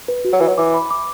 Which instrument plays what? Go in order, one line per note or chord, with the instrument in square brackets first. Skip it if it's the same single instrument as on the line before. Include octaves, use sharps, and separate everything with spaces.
[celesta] B4
F#4
[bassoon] F#3
[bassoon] E3 [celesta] B4
[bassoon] F#3
[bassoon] E3 [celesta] D6
[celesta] B5
D6